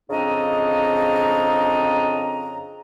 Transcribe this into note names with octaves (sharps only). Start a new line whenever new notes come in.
F2 C#3 C4 D4 D#5 A#5